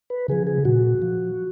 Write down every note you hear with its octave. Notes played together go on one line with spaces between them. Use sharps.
B4
C#3 F3 G#4
G#4
A#2 F#4
F3